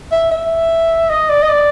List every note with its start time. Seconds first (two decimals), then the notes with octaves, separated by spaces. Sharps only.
0.12 E5
0.31 E5
1.10 D#5
1.29 D5
1.42 D#5
1.49 D5